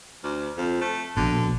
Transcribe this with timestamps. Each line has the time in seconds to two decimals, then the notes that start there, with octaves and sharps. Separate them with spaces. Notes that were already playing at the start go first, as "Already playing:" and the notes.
0.24 D2
0.57 F2
0.81 A3
1.17 A#1 B2 D3